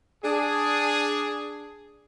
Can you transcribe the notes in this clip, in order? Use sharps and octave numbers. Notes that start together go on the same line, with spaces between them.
D4 G#4